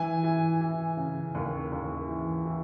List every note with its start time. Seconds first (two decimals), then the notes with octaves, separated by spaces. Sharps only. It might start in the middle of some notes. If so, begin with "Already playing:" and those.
Already playing: E3 G#5
0.23 E3
0.61 E3
0.97 C#3
1.35 D#2
1.72 D#2
2.08 E3
2.46 E3